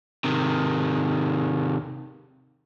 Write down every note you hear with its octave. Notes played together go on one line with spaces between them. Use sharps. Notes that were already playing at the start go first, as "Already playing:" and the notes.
C3 D#3